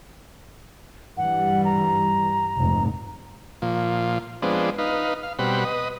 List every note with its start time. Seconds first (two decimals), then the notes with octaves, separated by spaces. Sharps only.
1.17 G2 E3 G3 F#5
1.65 A#5
2.58 F1 G#2
3.62 A#2 F3
4.42 F3 G#3 B3 C4 D4
4.78 D#4 B4 F5
5.23 F5
5.39 B2 G3 C4 F#4 B5
5.65 B4 D#5